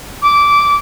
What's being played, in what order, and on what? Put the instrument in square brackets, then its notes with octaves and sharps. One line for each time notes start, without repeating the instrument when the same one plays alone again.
[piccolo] D6